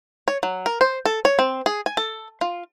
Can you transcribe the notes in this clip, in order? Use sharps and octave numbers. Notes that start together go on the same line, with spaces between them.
C#5
F#3
A#4
C5
A4
C#5
C4
G#4
G#5
A4
F4